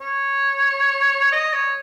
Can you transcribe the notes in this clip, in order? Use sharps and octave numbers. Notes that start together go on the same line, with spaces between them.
C#5
D#5
C#5